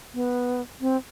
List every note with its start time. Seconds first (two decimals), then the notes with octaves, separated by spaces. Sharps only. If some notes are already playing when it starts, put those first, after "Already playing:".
0.14 B3
0.81 C4